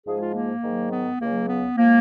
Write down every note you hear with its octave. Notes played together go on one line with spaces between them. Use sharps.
G#2 F3 G#3 G#4
F4
A#3
G#2 D#3 F#3
B3
C#2 C#3 F#3 A#3
B3
F3 G#3 A#3